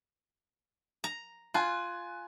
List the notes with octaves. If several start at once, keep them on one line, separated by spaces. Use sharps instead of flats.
A#5
F4 G#5 F#6